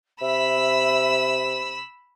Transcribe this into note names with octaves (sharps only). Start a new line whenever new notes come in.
C3 E5 B5 E6